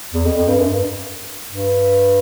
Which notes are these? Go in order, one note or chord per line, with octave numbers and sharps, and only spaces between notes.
E2
F2
F2
G2
F#2
G2
G2